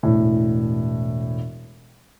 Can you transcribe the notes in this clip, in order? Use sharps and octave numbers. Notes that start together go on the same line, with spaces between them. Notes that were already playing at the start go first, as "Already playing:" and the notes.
E1 A2